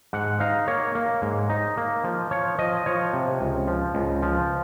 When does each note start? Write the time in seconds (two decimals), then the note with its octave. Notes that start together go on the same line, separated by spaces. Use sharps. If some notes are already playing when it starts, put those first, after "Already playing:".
0.13 G#2 F#5
0.40 D#4 F5
0.68 A#3 C#5
0.95 A#3
1.22 G#2
1.50 D#4
1.77 A#3
2.04 F3
2.31 F3 C#5
2.58 F3 D#5
2.86 F3 C#5
3.13 C3
3.41 C#2
3.67 F3
3.95 C#2
4.23 F3